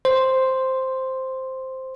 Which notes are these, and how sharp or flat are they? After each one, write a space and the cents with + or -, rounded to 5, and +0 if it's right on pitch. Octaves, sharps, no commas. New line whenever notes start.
C5 +0